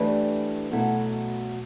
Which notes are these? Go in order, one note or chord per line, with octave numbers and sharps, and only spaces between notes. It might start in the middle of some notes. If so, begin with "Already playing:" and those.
Already playing: E3 A3 D4 G4 B4
B2 F#3 A3 E4 A4